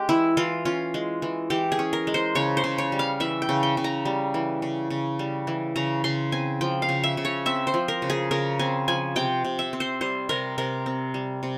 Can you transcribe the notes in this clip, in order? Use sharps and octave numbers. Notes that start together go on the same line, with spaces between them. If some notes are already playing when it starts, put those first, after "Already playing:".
Already playing: G#3 C#4 G4
E3 E4
E3 F4
C#4 F4
G#3
E3
E3 G4
G#4
C#4
A#4
G#3
C5
C#3 C#5
C5
C#3
C#5
G3
F5
E3 E5
G5
C#3
G5
C#3
A#5
G3
E3
C#3
C#3
G3
E3
C#3 A#5
C#3 C6
C4 G#5
F3 G5
F5
C#3
E5
C#3
C#5
C4 E5
C5
F3
A#4
C#3
G#4
C#3 A#4
C4 G#5
F3 G#5
C3 G5
C3
E5
C4
C5
G3 C5
C3 A#4
C3 A#4
C4
G3
C3